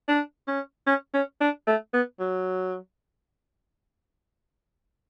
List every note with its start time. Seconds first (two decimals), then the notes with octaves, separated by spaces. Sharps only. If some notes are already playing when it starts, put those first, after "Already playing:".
0.08 D4
0.48 C#4
0.87 C#4
1.14 C#4
1.41 D4
1.67 A3
1.93 B3
2.20 F#3